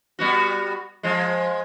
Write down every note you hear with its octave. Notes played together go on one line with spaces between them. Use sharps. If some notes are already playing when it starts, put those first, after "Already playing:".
G3 B3 F#4
F3 G#3